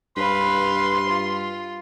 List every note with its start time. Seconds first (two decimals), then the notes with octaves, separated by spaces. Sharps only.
0.17 G2 B4 F5 C6
1.09 F4